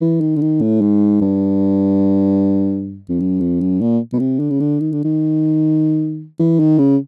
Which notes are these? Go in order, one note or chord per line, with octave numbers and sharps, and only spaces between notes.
E3
D#3
D3
D#3
A2
G#2
G2
F2
F#2
F2
F#2
A#2
B2
C3
D3
C#3
D3
D#3
D3
D#3
E3
D#3
C#3